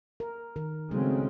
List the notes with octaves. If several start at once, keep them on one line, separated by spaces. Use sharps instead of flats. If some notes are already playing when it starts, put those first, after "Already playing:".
A#4
D#3 A#4
C#3 F#3 G#3 A3 C4 D#4